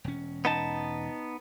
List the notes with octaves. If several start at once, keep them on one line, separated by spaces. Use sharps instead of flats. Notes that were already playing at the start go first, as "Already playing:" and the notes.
E1 C#4
B3 D#4 A5